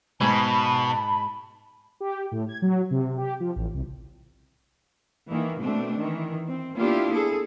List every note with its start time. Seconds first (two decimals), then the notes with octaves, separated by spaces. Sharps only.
0.21 G#2 B2 G#3 A5 B5
2.00 G4
2.32 A2
2.49 G#6
2.62 F#3
2.91 C3
3.18 G4
3.40 F3
3.56 A1
3.74 C2
5.30 D#3 E3 A#3
5.60 B2 A3 C4 D4
5.98 D#3 E3
6.45 C4
6.76 A#3 B3 D4 E4 F4 G4
7.12 G#4 A4